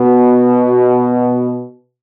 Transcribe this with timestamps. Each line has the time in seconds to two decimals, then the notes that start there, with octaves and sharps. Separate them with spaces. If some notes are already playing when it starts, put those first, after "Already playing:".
Already playing: B2